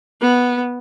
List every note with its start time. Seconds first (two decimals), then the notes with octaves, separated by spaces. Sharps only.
0.22 B3